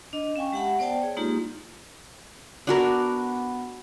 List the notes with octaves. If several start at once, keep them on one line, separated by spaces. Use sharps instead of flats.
D4 D#5
C#4 F5 G5 G#5 C#6
G#3 G4 E5 F#5 A5 B5
B3 C5 D5 G5 A5
G#4 C#5 D5
G#3 A#3 D#4 F4 G4
B3 D4 F#4 A#4